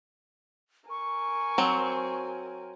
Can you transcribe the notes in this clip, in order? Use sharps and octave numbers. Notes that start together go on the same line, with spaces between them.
A#4 G#5 C#6
F#3 C4